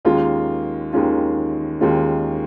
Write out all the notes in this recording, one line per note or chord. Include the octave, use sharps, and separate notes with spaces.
D#2 D#3 G#3 C#4 F4
D#2 D#3 G#3 C#4 F4
D#2 D#3 G#3 C#4 F4